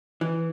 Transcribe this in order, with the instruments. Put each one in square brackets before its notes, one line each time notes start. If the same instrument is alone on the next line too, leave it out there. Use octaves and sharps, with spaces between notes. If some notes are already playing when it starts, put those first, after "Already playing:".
[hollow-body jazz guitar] E3